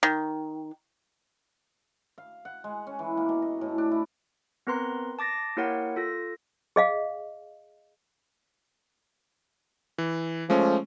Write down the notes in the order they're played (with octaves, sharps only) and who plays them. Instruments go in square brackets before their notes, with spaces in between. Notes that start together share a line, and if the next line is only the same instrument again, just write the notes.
[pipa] D#3
[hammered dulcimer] F5
F#5
G#3
C#4
E3
A#3
B2
D#5
A2
D4
E4
[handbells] B3 C4 A#4 B4 A#5 C6
A5 D6 A6 A#6
A#3 E4 G4 A#4 C#5 F#5
F4 A4 E6 A#6
[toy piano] G#4 D#5 F5
[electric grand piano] E3
[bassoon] F3 [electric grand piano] G#3 A3 C#4